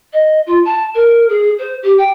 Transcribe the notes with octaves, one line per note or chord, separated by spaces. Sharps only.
D#5
F4
A5
A#4
G#4
C5
G4
G5